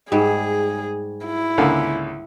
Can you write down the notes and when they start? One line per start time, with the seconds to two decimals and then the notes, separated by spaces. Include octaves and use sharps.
0.12 G#2 G3 G#4
1.26 E4
1.58 C#2 D3 A#3